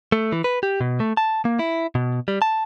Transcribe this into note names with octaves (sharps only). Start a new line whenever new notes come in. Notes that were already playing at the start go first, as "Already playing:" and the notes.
A3
E3
B4
G4
B2
A3
A5
A#3
E4
B2
G3
A5